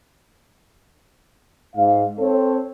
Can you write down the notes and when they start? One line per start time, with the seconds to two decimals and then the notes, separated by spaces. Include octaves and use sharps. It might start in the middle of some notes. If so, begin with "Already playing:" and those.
1.76 G#2 F5
2.19 C4 A4 C#5